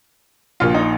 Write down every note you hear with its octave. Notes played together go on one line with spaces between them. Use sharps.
A#1 A#2 F4
D#4